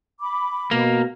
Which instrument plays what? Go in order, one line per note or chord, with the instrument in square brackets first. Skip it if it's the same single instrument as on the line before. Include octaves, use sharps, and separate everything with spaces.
[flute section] B5 D6
[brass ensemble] B2 [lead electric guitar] A#3